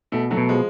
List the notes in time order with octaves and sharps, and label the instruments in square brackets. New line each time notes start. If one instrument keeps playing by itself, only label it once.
[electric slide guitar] B2 [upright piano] A3
[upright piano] F#3 A3
[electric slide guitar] B2
[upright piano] F3 G#3